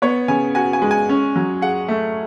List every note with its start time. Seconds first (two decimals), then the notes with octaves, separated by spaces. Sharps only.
0.02 B3 C#5
0.28 C#3 G#5
0.55 F#4 G#5
0.73 G#5
0.82 G#3
0.91 G#5
1.09 C#4
1.36 F#3
1.61 G#4 F#5
1.88 A3